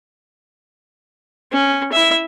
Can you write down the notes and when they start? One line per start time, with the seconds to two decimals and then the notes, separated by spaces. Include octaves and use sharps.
1.52 C#4
1.92 E4 E5